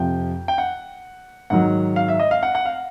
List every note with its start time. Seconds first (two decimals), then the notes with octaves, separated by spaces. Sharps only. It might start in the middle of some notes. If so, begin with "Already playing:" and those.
Already playing: F2 C3 F3 G5
0.48 G5
0.58 F#5
1.50 G#2 D#3 F#3 F#5
1.96 F5
2.08 E5
2.20 D#5
2.31 F5
2.43 F#5
2.55 F#5
2.66 F5